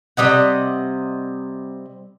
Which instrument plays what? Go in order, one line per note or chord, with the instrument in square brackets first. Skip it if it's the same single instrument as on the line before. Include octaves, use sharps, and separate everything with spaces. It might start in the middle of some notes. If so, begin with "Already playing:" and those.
[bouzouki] C3 G3 D#5 F#5